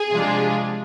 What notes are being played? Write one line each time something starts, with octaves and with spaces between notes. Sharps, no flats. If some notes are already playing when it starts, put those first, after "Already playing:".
Already playing: G#4
C3 F3 G#3 D4 F4